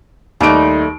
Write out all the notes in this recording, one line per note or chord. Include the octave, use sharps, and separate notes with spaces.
D#2 G3 A3 D#4 D7